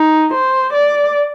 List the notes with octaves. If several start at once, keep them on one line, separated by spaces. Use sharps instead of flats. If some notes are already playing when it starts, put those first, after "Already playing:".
Already playing: D#4
C5
D5